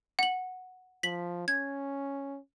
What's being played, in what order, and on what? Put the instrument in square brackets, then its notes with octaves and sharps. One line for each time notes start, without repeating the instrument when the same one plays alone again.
[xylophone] F#5 F#7
[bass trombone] F3 [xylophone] B6 F#7
[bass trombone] C#4 [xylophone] G#6